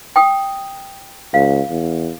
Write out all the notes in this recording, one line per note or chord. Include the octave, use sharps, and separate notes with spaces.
G5 D#6
C#2 F5
E2